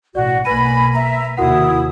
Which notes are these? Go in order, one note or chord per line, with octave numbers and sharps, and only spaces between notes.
A1 B2 F#4 D5
B1 A#3 B4 G#5 B5 A#6 D#7
E5 A#5
D#2 C3 E4 F#4 A#4 F#5 D#6